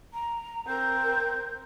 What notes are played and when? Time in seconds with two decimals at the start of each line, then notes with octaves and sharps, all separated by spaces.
0.14 A#5
0.67 C4 A#4 G6